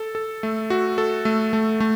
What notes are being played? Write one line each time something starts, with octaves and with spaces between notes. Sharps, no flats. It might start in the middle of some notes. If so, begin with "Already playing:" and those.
Already playing: A4
A4
A3
F#4
A4
A3
A3
A3